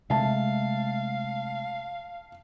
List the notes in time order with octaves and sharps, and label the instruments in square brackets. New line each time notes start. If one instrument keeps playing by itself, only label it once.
[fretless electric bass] C3 G#3 A3 [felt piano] E5 A5 [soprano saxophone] F5